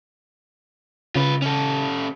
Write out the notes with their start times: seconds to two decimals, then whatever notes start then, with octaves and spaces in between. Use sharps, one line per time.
1.16 C#3 F4 B4
1.42 C#4 A4